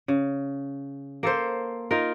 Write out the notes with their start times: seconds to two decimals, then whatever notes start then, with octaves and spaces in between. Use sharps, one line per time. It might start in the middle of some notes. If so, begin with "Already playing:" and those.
0.08 C#3
1.23 A#3 A4 C5
1.91 D#4 F4 A#4